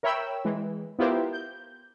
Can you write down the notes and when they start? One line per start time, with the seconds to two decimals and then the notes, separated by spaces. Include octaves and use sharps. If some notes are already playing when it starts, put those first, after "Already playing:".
0.03 A#4 C#5 E5 G5 B5 E6
0.45 E3 G#3
0.99 B3 E4 F4 G4 A#4 C5
1.33 G6